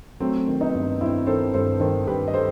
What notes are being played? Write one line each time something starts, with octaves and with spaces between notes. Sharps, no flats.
F#3 A3 C4
D#3
B3 D#4
G2
G2 C4 E4
D#3 A4 C5
G2 A4 C5
D#3 A4 C5
G2 G4 B4
D#5
A4 C5